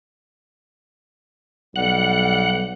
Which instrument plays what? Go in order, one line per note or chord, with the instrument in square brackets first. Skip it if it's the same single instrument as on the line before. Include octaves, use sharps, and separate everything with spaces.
[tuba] B1 [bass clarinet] G3 [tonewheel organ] F#5